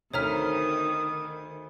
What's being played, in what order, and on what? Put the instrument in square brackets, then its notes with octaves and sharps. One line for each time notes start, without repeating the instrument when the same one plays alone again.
[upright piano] D2 C4 B6 [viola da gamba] D#3 [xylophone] C#5 A#5 F6 [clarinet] D#6